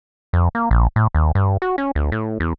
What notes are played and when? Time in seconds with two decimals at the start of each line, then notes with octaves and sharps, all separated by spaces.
0.33 F2
0.55 A#3
0.71 A#1
0.96 A2
1.15 D#2
1.35 G2
1.62 F#4
1.78 C#4
1.95 D2
2.12 A2
2.40 E2